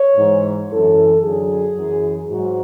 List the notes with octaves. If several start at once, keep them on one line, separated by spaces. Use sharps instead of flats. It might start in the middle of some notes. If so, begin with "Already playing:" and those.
Already playing: C#5
G#2 E3
F#2 E3 A4
F#2 D3 F#3 G#4
F#2 E3
G#2 F#3 F#4